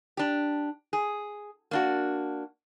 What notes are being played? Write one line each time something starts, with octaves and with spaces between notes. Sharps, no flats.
D4 G4
G#4
A#3 D4 F#4